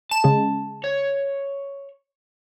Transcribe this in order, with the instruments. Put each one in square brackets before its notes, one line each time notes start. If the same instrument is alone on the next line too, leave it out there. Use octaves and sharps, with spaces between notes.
[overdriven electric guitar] A5 [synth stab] E7
[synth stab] C#3 G#3
[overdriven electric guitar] C#5